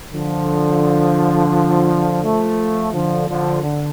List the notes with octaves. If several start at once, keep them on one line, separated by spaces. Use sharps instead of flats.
D3 F3
F3 A3
D3 F3
D3 F3
D3